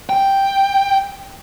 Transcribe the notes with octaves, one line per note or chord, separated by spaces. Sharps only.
G5